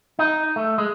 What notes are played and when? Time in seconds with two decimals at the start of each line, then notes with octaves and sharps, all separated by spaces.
0.19 D#4
0.56 A3
0.78 G#3